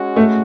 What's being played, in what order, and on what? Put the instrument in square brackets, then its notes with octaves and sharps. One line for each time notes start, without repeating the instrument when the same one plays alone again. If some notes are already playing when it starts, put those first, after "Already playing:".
Already playing: [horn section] G#3 C#4 F#4
[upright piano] A3